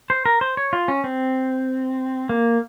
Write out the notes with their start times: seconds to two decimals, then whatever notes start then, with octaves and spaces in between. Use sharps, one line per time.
0.10 C5
0.26 A#4
0.41 C5
0.57 C#5
0.73 F4
0.88 C#4
1.04 C4
2.29 A#3